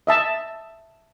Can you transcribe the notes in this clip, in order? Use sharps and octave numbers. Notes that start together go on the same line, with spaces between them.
D#5 E5 A5